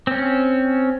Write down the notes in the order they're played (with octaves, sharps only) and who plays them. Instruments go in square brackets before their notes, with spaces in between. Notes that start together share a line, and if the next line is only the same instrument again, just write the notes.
[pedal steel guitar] C4 C#4